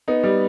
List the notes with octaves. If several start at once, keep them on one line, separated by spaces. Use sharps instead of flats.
B3 D#4
G3